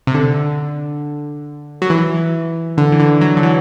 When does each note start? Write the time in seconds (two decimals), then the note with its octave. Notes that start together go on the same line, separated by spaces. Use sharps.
0.07 C3
0.14 D3
1.82 F#3
1.90 E3
2.78 D3
2.92 E3
3.00 D3
3.21 F#3
3.37 D3
3.43 E3